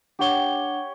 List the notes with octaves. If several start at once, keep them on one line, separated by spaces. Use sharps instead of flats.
D4 G4 C#5 F#5 G7